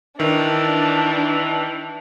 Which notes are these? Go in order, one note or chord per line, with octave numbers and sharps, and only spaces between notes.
D#3 E3 D4